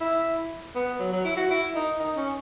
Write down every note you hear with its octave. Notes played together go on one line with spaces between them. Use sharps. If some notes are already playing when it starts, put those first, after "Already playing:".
E4
B3
F#3
F#3
E4
F#4
E4
D#4
D#4
C#4